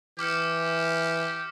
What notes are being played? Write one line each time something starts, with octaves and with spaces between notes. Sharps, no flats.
E3 G4 D6 F6 C#7